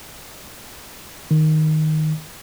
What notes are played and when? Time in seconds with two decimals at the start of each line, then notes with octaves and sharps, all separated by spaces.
1.31 D#3